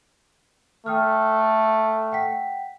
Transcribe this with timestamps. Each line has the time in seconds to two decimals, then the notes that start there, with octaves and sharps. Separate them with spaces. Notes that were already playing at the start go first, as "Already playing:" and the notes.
0.86 A3 G5 D#6 F6
2.12 F#5 G5 B6